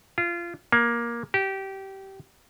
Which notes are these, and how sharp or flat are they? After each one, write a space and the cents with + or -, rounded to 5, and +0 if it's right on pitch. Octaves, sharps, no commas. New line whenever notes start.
F4 -25
A#3 +15
G4 -20